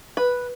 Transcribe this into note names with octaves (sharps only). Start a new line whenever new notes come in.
B4